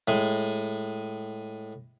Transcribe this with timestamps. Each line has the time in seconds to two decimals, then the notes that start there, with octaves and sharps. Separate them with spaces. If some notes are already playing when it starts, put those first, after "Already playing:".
0.08 A2 G#3